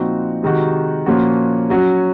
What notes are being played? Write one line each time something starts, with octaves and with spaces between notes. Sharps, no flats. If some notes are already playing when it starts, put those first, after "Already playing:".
Already playing: A#2 F3 C4 D#4 F#4
C3 D#3 G#3 D#4 F#4
A#2 F3 A#3 C#4 F#4
F#3 C#4 F#4